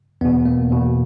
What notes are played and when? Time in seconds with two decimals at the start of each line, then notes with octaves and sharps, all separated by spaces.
0.21 E2 B2 B3
0.46 A#3
0.70 E2 B2